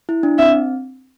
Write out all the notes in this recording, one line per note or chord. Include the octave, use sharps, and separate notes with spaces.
E4
D4
C4 E5